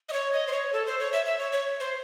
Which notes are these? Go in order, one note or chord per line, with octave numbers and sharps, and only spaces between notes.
D#5
C#5
D#5
C5
C#5
A4
C5
C#5
E5
E5
C#5
C#5
C5